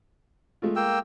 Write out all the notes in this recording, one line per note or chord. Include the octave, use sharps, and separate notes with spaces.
G#3 A3 F4
A#3 G5 E6